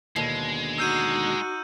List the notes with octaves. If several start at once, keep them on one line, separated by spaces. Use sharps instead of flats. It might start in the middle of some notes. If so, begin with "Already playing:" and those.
D#2 B2 D3 G#3
D#4 F#4 E6 G6 D#7